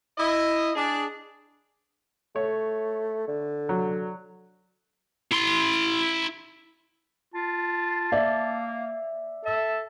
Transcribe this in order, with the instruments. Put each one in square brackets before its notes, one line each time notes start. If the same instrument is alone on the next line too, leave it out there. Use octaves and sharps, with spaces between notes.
[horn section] E4 D#5
D4 G#4 D5
[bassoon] A3 [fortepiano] C#5
[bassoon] D3
[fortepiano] F#3
[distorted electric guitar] E4 C6
[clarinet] F4 [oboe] A5
[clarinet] A#3 [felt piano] D5 E5
[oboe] A4 [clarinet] E5